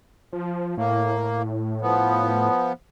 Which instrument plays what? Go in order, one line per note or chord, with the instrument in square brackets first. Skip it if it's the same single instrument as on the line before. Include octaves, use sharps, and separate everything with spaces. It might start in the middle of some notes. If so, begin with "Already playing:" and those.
[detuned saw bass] F3
[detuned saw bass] A2 [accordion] A#3
[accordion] F3 B3